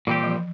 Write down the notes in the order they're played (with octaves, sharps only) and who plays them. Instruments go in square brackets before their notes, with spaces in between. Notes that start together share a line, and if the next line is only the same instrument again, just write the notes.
[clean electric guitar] A#2 G3 C4 G4 [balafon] E3
[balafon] F3